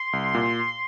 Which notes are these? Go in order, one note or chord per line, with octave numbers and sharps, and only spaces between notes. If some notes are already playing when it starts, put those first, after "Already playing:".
Already playing: C6
C2
A#2